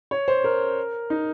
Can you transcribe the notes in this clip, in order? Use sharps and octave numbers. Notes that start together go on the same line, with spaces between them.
C#5
C5
A#4
D#4